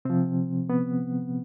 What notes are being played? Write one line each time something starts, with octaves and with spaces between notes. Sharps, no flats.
C3 F3 C4
B3